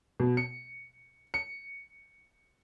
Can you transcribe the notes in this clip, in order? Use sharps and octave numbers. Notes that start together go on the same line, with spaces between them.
B2
C#7
C#7